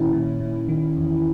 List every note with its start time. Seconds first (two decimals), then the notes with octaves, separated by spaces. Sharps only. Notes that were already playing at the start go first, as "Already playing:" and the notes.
Already playing: A#2 D#3 C#4 E4
0.13 A#2
0.40 A#2
0.68 D#3
0.97 E2